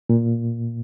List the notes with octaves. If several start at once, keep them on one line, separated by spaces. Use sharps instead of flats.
A#2